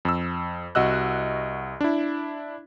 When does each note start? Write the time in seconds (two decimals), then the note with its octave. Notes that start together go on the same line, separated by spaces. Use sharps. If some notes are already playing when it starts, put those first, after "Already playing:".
0.05 F2 E6
0.75 C2 F#4 D#5 E6 F#6
1.81 D4 E4